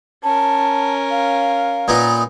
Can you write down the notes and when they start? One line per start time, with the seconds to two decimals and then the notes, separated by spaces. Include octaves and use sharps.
0.24 C#4 A#4 A5
1.11 F5
1.88 A#2 B3 D#4